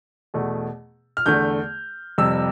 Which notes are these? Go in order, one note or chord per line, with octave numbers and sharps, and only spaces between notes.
E2 B2 A3
F6
E2 D3 A3 G6
F2 C3 G3 E6